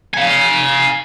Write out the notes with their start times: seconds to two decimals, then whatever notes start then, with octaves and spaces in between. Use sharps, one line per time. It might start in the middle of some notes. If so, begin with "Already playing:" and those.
0.14 F5 G#5